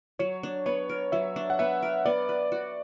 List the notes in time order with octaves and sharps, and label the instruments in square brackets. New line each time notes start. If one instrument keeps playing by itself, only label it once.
[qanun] F#3 [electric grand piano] C#5
[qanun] D4
[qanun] B3 [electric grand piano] C#5
[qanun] A#4
[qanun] F#3 [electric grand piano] E5
[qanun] D4
[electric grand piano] F#5
[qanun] B3 [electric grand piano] E5
[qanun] A#4
[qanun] B3 [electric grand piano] D5
[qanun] B4
F#4